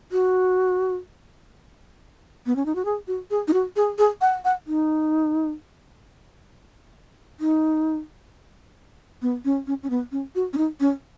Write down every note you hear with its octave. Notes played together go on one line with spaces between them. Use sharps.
F#4
B3
C#4
D#4
F#4
G#4
F#4
G#4
D#4
F#4
G#4
G#4
F#5
F#5
D#4
D#4
B3
C#4
C#4
C#4
B3
C#4
F#4
C#4
D#4
C#4